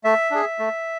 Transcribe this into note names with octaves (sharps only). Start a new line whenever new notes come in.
A3 E5
D4 G#4
A3